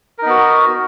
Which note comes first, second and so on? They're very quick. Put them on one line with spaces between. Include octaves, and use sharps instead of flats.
A#4 D#4 B3 F#4